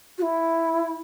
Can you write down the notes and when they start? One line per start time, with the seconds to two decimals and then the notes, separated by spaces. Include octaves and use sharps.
0.18 F#4
0.22 E4